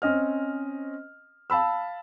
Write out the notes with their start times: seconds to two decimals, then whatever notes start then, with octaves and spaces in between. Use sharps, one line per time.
0.02 C4 C#4 D#5 F6
1.50 F5 A5 B5 E6